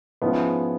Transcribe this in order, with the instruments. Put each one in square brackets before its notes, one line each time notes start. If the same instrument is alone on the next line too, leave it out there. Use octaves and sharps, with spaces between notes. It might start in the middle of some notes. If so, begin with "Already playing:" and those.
[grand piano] G#2 F3 G#3 C#4 E4 [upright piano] B3